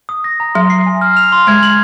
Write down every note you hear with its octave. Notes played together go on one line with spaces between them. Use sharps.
D#6
A#6
A#5
F#3 C6
C7
G#5
F6
F7
C6
G#3 G#6
F#7